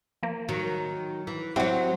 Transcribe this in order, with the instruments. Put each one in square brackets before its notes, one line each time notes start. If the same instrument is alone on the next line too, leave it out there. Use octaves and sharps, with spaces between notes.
[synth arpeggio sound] F3 A#3
[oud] D#3 F#3
E3
[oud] F#3 C4 [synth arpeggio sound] E4 G4 F#5